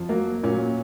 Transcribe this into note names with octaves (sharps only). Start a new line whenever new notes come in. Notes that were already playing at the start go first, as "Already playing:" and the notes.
Already playing: F2 F3
F#3 A#3
A#2 F#3 A#3 C#4